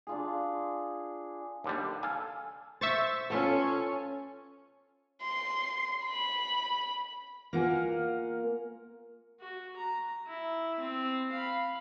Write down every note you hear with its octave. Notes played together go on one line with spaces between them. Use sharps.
D4 F4 G#4
D#2 D3 G3
A4 F5 G#5
C5 E5 C#6 A6
B3 C#4 F4 A4
C6
B5
A#3 F4 A#4 F#5 G#5
F#4
A#5
E4
C4
F5 B5